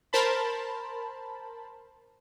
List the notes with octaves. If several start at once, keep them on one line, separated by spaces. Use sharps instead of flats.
A#4 C5 A5 B5